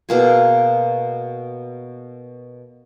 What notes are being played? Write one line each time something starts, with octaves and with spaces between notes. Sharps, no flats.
B2 A#3 G#4